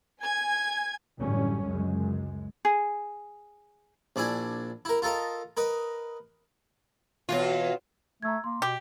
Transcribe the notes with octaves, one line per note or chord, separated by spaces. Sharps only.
G#5 G#6
A1 F#2 D3 G3 C#4
C#2 F#2 G#3
G#4
A#1 D4 E4 G#5
E4 A#4
F4 A4 A#4 D#5
A#4 B4 D#5
B2 E3 F4 F#4 C#5
A3 A#5 E6 G#6
A#3 C6
B2 G4 D6